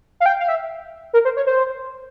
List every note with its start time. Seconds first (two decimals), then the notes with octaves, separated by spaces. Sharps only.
0.20 F5
0.26 G5
0.40 F5
0.48 E5
1.13 A#4
1.25 C5
1.37 C#5
1.47 C5